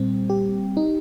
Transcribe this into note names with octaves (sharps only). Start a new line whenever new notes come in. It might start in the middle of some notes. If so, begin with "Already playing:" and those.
Already playing: A#2 G3 C4
G4
D#4